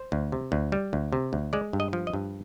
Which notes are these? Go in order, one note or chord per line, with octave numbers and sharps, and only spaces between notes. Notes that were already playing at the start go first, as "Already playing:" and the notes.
Already playing: C5
D2
C3
D2
G3
D2
C3
D2
G#3 D5
G2
D#5
F3
D#5
G2